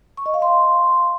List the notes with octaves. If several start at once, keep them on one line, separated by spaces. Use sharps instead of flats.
C#6
D#5
F5
C6